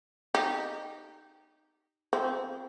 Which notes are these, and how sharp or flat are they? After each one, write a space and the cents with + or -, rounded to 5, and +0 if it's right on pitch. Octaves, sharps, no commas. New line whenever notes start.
D#4 -10 G4 +0
F3 +0 C4 +0 C5 -25